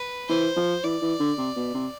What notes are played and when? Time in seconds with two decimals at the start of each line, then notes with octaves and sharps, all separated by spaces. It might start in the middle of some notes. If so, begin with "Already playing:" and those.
Already playing: B4
0.29 E3 C5
0.56 F3
0.83 E3 D5
1.01 E3
1.20 D3
1.38 C3
1.56 B2
1.74 C3